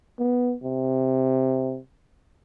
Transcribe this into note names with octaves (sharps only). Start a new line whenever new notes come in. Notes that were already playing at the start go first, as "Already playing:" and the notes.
B3
C3